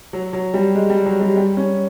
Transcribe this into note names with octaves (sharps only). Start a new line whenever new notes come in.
F#3
F#3
G3
G#3
G3
F#3
G3
G3
C#4